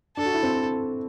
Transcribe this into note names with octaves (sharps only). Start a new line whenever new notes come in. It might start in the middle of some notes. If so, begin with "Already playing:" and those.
D4 A4
F#4
E4
C4